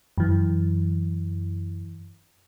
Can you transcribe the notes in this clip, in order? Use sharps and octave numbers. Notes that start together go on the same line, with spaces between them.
F#2 E3